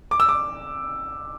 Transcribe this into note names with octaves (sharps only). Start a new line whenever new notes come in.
D6
E6
D6